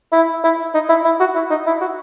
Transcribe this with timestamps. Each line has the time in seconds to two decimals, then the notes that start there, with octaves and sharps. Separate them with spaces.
0.13 E4
0.44 E4
0.74 D#4
0.89 E4
1.05 E4
1.20 F#4
1.35 E4
1.50 D#4
1.67 E4
1.81 F#4